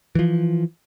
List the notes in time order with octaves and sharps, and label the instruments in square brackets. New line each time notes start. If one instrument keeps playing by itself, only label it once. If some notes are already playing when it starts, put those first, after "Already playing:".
[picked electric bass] E3 F3